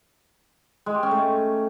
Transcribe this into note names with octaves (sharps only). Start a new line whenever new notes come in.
G#3
G4
C#4
A3